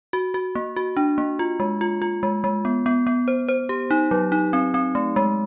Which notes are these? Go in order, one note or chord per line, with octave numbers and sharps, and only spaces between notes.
F#4
F#4
A#3
F#4
D4
A#3
F4
G#3
F4
F4
G#3
G#3
B3
B3
B3
C5
C5
G4
D#4
F#3
D#4
C4
C4
A3
G#3